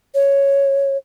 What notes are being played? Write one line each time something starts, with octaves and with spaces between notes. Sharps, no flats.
C#5